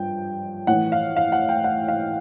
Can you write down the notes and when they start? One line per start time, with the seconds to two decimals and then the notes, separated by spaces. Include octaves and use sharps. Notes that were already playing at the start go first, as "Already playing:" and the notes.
Already playing: G2 F3 G5
0.67 A2 E3 F#5
0.92 F5
1.17 F5
1.32 F#5
1.49 G5
1.64 F#5
1.88 F5